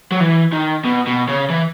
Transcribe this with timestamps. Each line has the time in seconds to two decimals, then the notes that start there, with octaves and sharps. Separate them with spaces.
0.12 F#3
0.20 E3
0.53 D#3
0.85 B2
1.07 B2
1.28 C#3
1.50 E3